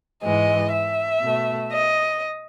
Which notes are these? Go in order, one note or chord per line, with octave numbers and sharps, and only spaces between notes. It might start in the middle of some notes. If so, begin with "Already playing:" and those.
G#2 E3 G#3 D#5
E5
B2 A3
D#5